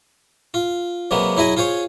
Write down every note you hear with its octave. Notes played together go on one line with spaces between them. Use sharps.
F4
C3 F#3 G#3 A#3 B3
F#3 E4 G#4 D#5
F4 G#4 C5 C#5